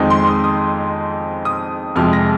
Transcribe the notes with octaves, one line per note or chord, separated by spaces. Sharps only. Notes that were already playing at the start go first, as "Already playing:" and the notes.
Already playing: F2 D#3 G#3 C4 D#4
C6
C6
D#6
D#6
D#6
F2 C3 F3 G#3 F6
A#6